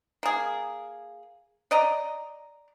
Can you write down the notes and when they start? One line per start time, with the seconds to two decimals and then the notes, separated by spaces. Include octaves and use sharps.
0.23 A#3 G#4
1.71 D5 D#5 A#5